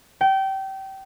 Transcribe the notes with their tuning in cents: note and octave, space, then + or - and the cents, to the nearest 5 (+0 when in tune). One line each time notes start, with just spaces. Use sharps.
G5 -25